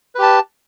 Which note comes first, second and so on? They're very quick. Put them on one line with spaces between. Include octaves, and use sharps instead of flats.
B4 G4 A5